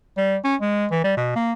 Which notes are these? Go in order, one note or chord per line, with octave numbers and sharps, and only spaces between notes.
G3
C#4
G#3
E3
G3
B2
A#3